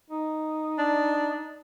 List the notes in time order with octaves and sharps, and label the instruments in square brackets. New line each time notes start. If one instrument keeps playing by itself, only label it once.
[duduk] D#4
[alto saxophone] D4